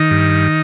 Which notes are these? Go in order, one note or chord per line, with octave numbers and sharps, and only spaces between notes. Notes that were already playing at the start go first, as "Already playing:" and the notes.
Already playing: D#3 D#4
G2